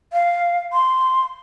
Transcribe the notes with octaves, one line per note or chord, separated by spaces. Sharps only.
F5
C6